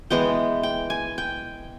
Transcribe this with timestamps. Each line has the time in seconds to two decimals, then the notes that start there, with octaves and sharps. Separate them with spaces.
0.10 E3 G#3 B3 G5
0.63 G5
0.90 G#5
1.18 G5